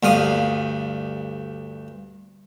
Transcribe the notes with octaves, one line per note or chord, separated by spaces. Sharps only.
D2 G2 F5 D#6